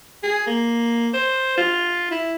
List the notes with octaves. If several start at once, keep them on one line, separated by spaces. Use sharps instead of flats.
G#4
A#3
C5
F4
E4